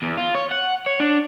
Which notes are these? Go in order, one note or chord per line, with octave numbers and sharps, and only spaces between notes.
E2
F4
C#5
F#5
C#5
D4